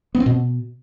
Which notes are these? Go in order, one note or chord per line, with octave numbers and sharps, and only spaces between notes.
B3
C4
B2